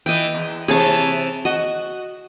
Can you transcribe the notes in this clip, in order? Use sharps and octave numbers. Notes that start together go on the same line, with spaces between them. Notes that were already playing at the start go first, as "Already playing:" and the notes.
E3 D#5 G5
E2
C3 E3 G#4 C#5 A5
F#4 D#5